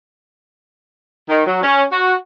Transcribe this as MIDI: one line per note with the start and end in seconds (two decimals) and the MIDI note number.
1.29 1.43 51
1.47 1.62 54
1.62 1.83 61
1.91 2.14 66